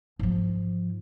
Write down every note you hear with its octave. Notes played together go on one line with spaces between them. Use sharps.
G#2 F3